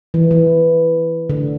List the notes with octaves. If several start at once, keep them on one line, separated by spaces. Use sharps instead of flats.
E3
E3
D3